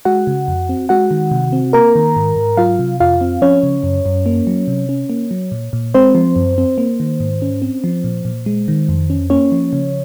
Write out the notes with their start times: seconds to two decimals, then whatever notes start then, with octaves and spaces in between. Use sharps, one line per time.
0.05 G#3 F#4 F#5
0.27 C#3
0.48 F2
0.69 C4
0.89 G#3 F#4 F#5
1.11 D#3
1.31 C3
1.53 C4
1.73 A#3 A#4 A#5
1.95 D#3
2.16 G#2
2.36 G#2
2.57 F#3 F4 F5
2.79 C3
3.00 F2 F4 F5
3.21 C4
3.42 F3 C#4 C#5
3.63 C#3
3.83 F#2
4.06 F#2
4.26 A#3
4.47 F#3
4.68 C3
4.89 C#4
5.10 A#3
5.31 F#3
5.52 A#2
5.73 A#2
5.94 G#3 C4 C5
6.15 F3
6.36 F#2
6.58 C4
6.78 A#3
7.00 D#3
7.20 G#2
7.42 C#4
7.62 C4
7.84 F3
8.04 A#2
8.25 A#2
8.46 G#3
8.68 D#3
8.89 F2
9.10 C#4
9.30 A#3 C#4 C#5
9.52 F3
9.73 C#3